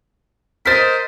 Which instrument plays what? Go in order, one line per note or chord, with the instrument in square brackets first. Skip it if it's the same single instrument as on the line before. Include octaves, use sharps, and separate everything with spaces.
[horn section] A#4 C5 D#5 [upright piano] A6 B6